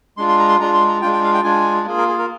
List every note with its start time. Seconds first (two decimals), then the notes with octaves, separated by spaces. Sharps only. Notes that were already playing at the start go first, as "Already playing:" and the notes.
0.17 G#3 D4 F4 C6
0.29 C6
0.39 A#5
0.48 C6
0.60 G#3 D4 F4 A#5
0.74 C6
0.88 A#5
1.01 G#3 D4 F4 G5
1.13 G5
1.24 F5
1.34 G5
1.44 G#3 D4 F4 G#5
1.87 A#3 F4 G#4
1.97 A#4
2.08 G#4
2.19 A#4